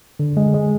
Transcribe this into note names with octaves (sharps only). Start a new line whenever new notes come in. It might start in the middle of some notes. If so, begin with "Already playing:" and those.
D3
G#3
G#3